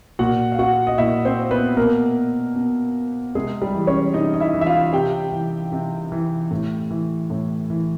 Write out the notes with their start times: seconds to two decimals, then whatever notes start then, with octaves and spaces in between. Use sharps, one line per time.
0.19 A#2 F#4 F#5
0.52 F5
0.59 F#4 F#5
0.87 D#5
0.98 A#2 E4 E5
1.25 C4 C5
1.51 B3 B4
1.77 B2 A#3 A#4
2.56 B2
3.35 C3 G#3 G#4
3.62 G3 G4
3.74 E3
3.87 C#4 C#5
4.14 C3 D#4 D#5
4.34 D#5
4.40 E4 E5
4.54 E3
4.61 E5
4.66 F4 F5
4.93 C3 G4 G5
5.32 E3
5.72 C3
6.12 E3
6.51 A2
6.90 E3
7.30 A2
7.70 E3